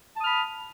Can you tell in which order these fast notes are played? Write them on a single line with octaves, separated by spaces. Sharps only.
A5 D#6 F6 B5